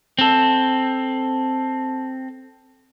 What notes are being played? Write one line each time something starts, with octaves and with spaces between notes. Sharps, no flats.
C4 A4